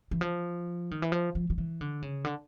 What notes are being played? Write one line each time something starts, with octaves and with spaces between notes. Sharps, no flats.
E3
F3
D#3
E3
F3
F3
F3
E3
D3
C#3
D3